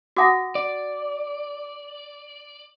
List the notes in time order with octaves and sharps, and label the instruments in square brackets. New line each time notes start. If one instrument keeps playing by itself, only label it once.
[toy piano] F#4 F#5 A5 [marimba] D6 D#6 A#6
[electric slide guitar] D5